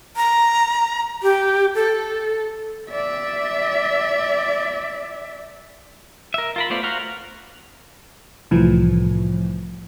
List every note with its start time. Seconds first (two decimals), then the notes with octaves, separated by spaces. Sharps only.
0.16 A#5
1.23 G4
1.75 A4
2.90 D5 E5
6.34 A#4 E5
6.56 F4 A#4 B5
6.70 A3 B3 F4 C5 D5
6.83 F#4 C5 F5 A#5 F6
8.51 C2 A2 E3 F3 A3